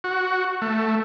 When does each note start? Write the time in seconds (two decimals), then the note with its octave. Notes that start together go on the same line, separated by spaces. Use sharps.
0.04 F#4
0.62 A3